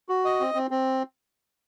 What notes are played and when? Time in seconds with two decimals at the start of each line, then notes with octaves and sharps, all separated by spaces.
0.09 F#4
0.25 D#5
0.40 C4
0.54 C4
0.71 C4